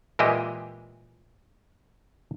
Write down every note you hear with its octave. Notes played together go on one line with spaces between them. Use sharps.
A#2 E3 G#3 E4 G4 D#5